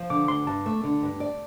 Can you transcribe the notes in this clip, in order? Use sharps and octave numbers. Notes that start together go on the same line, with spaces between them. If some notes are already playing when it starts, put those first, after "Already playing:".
Already playing: F3
D3 D6
D2 C6
G2 A5
A3
D3
G2
D5